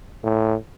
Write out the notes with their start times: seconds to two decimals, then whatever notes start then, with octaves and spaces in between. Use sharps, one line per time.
0.24 A2